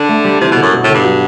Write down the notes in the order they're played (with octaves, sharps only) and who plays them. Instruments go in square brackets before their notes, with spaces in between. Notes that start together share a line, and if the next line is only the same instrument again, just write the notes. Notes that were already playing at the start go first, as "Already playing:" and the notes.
Already playing: [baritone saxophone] D3
[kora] A3
G3
[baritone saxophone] C3 [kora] E3
[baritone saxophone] B2
[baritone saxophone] F#2 [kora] D3
[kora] B2
[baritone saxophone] A2
[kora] D3
[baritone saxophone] G2
[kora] F#3